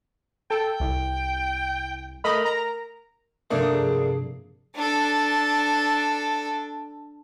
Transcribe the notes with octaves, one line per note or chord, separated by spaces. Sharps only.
A4 G5
C2
A3 A#4 D#5 B5
A#5
G2 C3 F3 A3 A#3 D4 D#6
G2 G#4
D4 A4